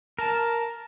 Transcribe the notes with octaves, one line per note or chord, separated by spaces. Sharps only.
A#4 A5